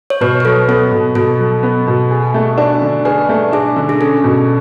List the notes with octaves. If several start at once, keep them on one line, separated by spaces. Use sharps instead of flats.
C#5
B2 B4
B4
F#3 A4
B3 A4
B2
B2 A4
F#3
B3
B2
G#4
A3
D4
D3
G#4 B4
A3
D4 G#4
D3
G#4
C#4 A4
B2